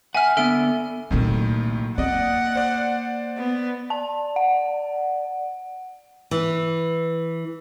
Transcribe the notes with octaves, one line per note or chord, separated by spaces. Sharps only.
E5 F#5 G#5 F6
D3 B3 A4 E5 D7
C2 A#2 D#3 F#3 A3
A#3 D5 D#5 F#5
C5 D5
B3
D5 A5
F#5
E3